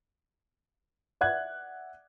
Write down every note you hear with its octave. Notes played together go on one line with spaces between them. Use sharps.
D5 E5 F#5 F#6 G#6